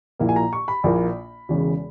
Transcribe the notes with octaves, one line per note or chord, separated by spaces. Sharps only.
A#1 A#2 A#3 E4
G#5
A#5
C#6
B5
A#1 A#2 A#3 E4
E1 E2 C#3